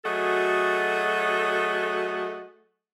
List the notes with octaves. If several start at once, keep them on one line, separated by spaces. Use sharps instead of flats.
F#3 A3 F#4 G#4 A4 D#5